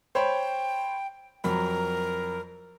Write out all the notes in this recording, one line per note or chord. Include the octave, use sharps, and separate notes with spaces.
C5 C#5 G5 B5
F2 F#3 A#4 B5